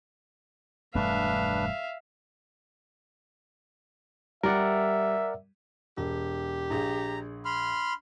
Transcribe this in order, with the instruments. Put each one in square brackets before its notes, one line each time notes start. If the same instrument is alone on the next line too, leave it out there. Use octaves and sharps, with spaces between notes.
[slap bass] E1 G2 A3 [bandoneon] D4 B4 [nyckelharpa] E5 F5
[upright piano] G3 [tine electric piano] A#4 D5 F#5 [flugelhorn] E5
[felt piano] E1 [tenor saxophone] G4
[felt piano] A#1 G#4 [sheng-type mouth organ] A#5
[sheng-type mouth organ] B5 C6 F6